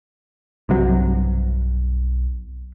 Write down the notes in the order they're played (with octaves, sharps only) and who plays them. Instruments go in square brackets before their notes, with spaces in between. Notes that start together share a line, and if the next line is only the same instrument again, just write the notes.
[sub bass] B1 [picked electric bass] G2 C3 F#3